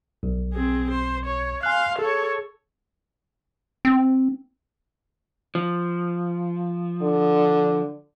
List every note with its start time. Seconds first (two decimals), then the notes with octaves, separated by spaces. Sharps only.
0.23 B1
0.53 C4 G#4
0.90 C5
1.26 C#5
1.63 F5 G#5 C6 F#6
1.99 G#4 A4 C#5
3.85 C4
5.55 F3
7.02 D3